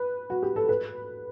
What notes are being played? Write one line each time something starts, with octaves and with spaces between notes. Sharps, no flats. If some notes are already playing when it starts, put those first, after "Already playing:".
Already playing: B4
F#4
G4
A4
B4